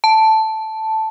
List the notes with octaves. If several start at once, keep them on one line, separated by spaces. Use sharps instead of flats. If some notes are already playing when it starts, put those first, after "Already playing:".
A5